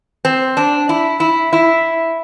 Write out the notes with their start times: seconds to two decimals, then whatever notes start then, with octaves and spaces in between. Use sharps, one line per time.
0.25 C4
0.57 D4
0.89 E4
1.20 E4
1.53 E4